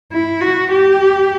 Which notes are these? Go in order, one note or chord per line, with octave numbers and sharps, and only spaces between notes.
E4
F#4
G4